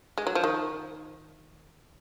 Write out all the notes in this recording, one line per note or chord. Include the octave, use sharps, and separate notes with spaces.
G#3
F#3
F3
D#3